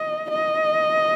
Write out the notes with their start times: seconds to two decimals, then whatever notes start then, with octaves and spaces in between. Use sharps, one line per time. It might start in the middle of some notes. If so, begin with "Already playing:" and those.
Already playing: D#5
0.30 D#5